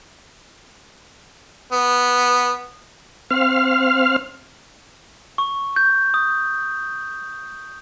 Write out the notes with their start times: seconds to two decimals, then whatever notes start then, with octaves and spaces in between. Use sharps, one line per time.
1.72 B3
3.31 C4 F5 F6
5.38 C#6
5.76 G6
6.14 D#6